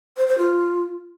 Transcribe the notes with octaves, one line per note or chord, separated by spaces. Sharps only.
C5
C5
F4